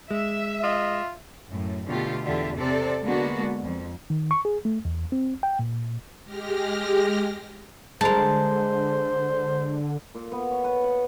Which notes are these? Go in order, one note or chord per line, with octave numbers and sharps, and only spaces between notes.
G#3 E5
F4 D#5
F#2 A2
B2 D3 A3 F4 G4
E2 D3 F4 G4 E5
C3 C4 A4 D5
D3 G#3 A#3 B3 D4 F#4
F2
D#3
C#6
G#4
A3
E2
C4
G5
A#2
G#3 G4 F6 A#6
D3 G#3 A#4 C5 A5
A#2
B3
C#5
B4
F#5